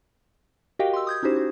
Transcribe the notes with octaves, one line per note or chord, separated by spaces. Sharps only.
F#4 G4 A#4 D#5 F5 G5
C6 E6
D#6 G6 G#6
C#4 D#4 E4 F#4 G4 C5
F#4